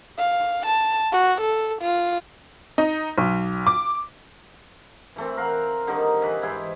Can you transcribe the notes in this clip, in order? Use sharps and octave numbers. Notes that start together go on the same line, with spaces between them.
F5
A5
F#4
A4
F4
D#4
B1
D6
E3 A3 C4
A#4 F5 F#5
D3 D#3 G3 D#4
E3 B4
G#2 E3 E4 C5